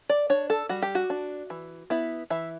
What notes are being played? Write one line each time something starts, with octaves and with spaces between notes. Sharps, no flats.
D5
D4 C#5
A4
G3 F#4
G4
F#4
D4
E3
B3 E4
E3 E5